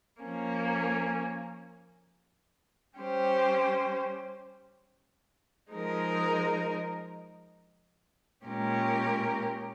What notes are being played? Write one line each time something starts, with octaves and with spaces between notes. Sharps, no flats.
F3 A#3 C#4
G3 C#4 G4 C5
F3 G#3 D#4 A#4
A#2 G#3 C#4 G4 A#4